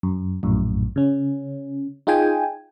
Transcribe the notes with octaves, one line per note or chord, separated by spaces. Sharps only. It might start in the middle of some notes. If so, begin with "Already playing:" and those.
F#2
A#1 F#2 A2
C#3 C#4
D#4 F4 G#4 G5 G#5